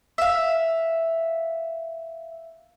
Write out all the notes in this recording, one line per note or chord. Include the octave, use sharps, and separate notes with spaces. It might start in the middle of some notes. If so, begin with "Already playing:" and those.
E5 F5